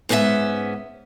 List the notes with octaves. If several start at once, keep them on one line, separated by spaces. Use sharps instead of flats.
G#2 B3 C#4 F4 E5